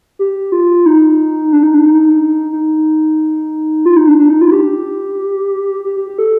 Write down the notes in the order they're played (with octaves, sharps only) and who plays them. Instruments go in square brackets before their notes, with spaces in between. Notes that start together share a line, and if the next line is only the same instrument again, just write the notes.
[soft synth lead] G4
F4
D#4
D4
D#4
D4
D#4
D#4
F4
D#4
D4
D4
D#4
F4
G4
G4
G4
G4
A4